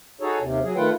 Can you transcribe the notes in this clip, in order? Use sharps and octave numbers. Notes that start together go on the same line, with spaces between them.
D#4 F#4 G#4 A4 C#5
D#2 C3
F#3 G#4
D#3 A3 F4 B4 F#5 G5